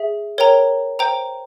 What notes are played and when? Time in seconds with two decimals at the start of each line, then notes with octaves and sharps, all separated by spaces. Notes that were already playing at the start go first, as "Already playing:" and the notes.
Already playing: G#4 E5
0.38 A#4 C#5 G5 A#5
0.99 C5 G5 A#5